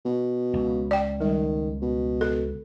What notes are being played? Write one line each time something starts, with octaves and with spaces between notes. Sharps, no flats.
B2
C#2
D5 G5
D#3 G3
B2
A4